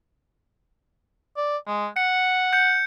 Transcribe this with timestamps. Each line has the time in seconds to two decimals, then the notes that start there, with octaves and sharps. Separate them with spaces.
1.37 D5
1.67 G#3
1.96 F#5 C#7
2.53 G6 C#7